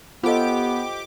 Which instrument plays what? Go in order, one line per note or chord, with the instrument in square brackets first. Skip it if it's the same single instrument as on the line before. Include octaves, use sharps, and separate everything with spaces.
[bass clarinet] B3 [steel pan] F4 A4 [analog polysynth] G4 D6 [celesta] C5 D#5